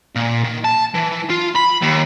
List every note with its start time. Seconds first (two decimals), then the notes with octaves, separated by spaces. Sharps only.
0.16 A#2
0.44 D#3
0.65 A5
0.95 E3
1.30 F4
1.55 B5
1.82 D#2